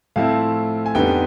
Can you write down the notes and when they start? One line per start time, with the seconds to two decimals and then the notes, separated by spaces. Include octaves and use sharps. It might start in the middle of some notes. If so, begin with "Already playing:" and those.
0.16 A2 F3 A3 C4 E4 F5
0.86 G#5
0.95 F2 D3 G3 B3 D#4 G5